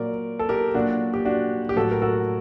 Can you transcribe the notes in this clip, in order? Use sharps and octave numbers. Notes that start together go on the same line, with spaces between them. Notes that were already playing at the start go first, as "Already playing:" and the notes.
Already playing: A#2 F#3 A#4 D5
A4
G4 A#4
A#2 F#3 D4 F#4
G4
D4 F#4
G4
A2 F#3 F#4 A4
A#4
F#4 A4